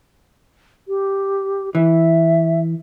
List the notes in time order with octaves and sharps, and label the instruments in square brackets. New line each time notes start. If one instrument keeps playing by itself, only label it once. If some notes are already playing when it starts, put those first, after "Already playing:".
[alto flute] G4
[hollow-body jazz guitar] E3 [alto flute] E5